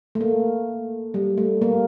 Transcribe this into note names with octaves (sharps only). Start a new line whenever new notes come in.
A3
A#3
G3
A3
A#3